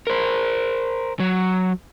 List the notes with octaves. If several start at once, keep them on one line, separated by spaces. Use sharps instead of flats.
A#4 C5
F#3